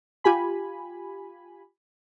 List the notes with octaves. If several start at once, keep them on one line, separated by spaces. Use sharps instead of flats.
F4 G4 G#5 B5